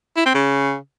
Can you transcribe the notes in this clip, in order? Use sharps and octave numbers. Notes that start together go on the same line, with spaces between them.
E4
C4
C#3